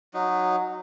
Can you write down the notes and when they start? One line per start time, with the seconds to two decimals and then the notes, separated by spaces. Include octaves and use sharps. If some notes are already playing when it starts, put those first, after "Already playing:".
0.14 F#3 D#4